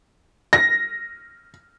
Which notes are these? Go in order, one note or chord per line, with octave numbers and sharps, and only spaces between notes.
A#6